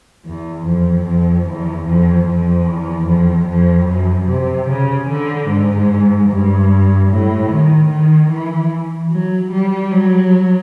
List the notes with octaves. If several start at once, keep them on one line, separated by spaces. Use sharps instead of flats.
E2
F2
F2
E2
F2
F2
E2
F2
F2
F#2
C3
C#3
D3
G#2
G2
A2
D#3
D#3
E3
F#3
G3
F#3